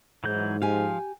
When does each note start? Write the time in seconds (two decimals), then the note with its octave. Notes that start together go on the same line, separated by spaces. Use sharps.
0.24 G#2 E3 F#3 G6
0.62 F3 G4 F5 G#5